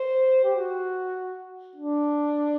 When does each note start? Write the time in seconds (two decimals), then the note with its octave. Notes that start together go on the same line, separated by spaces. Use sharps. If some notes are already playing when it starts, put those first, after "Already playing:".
Already playing: C5
0.44 G4
0.55 F#4
1.76 D4